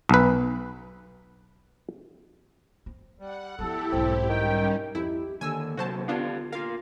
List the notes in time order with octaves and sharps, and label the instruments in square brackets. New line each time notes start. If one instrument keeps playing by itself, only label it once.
[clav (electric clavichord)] B1 B4
[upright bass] C4
[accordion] G3 [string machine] F#5
[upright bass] F3 B3 [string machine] E4 G4 [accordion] A4
[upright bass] B1 G#2 [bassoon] C4
[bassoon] D#3 [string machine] G3 C#4 [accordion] G5
[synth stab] F2 E4 [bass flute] G4
[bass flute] D3 [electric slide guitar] D#3 A#3 [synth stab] G#5 E6
[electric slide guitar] C3 F#3 A#3 [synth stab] F#4 C5 A5
[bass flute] D3 [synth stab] B3 D4 F4 [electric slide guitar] G4 D5 F5
[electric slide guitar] F4 A#4 [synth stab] F5